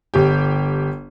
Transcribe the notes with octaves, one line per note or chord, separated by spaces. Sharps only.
G1 G4